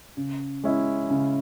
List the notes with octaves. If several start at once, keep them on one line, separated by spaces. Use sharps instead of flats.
C#3
G#3 C#4 E4
C#3